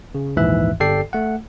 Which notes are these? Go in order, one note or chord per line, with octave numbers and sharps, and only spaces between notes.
C#3
A#1 D#2 G#2 E3 E5 F#6
G1 G4 A4 D5 G5 C7
A3 F#5